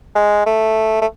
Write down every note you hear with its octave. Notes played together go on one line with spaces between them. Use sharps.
G#3
A3
A3